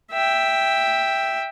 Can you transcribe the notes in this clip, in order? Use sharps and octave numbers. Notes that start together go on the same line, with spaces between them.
E5 G5